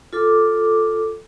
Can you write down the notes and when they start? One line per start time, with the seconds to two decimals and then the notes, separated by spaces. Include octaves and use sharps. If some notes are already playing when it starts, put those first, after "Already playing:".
0.13 F4 A4 D6